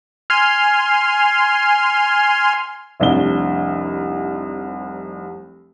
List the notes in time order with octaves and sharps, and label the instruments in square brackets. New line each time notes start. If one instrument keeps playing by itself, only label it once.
[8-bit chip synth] G#5 C6 F6
[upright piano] F1 C2 D4 G7